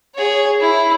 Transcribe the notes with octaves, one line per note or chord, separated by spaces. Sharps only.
G#4 C#5
E4